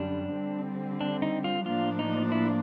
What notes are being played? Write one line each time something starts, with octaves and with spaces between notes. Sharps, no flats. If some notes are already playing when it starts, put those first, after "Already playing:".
Already playing: F#2 D3 G3 D4
D3 G3 C4
D4
D#4
F4
A2 F3 A#3 D4 F4
D#4
E4